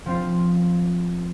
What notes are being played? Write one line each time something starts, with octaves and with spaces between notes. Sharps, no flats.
F3 C4 F4